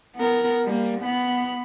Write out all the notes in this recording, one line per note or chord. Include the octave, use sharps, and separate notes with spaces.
B3 A#4
G3 A#3
B3 B5